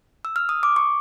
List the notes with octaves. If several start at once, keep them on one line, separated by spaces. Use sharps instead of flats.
E6
F6
D#6
D6
C#6